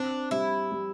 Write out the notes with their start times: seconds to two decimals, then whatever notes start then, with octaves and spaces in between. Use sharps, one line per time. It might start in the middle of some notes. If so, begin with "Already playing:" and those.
Already playing: C4 D4
0.31 G3 E4
0.72 G3